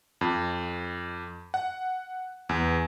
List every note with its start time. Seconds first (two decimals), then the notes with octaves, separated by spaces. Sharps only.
0.21 F2
1.54 F#5
2.49 E2